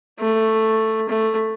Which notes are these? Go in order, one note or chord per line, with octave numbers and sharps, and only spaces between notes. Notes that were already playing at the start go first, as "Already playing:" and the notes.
A3
A3